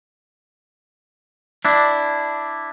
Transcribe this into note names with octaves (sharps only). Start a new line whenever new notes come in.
D4 E4